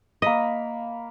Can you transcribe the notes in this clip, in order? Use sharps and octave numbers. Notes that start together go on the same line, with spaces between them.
A#3 D#5 B5